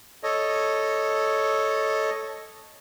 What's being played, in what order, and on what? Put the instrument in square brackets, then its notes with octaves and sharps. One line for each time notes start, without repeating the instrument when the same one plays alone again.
[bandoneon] A4 C#5 D#5